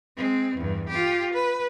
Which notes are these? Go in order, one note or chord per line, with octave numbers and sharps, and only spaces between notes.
G#3 C4
E2 G2
F4 G4
B4